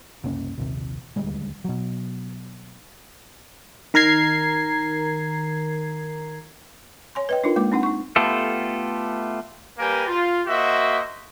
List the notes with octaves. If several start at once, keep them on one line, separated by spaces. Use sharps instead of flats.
F#1 C2 A#3 C#4
A#1 D#2 C3
D#1 D2 G3 G#3
B2 F#3
D#3 A#4 A#5 G#6 C7
C#5 G#5 C6
B4 D#5 G5
D4 D#4 F4 A#4
G#3 A#3 D6
C4 D4 D#4 F#5
D#4 C#6
A3 B3 F4 G4 A4
G3 A#3 G4 A#4 B4 G#5
F4
A#3 F#4 C5 D#5 E5